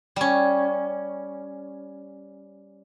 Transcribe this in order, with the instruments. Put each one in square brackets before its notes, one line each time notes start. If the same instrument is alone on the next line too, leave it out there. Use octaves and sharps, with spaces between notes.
[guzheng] G3 C#4